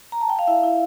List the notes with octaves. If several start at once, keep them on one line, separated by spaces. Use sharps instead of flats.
A#5
A5
G5
F5
E4 E5
E4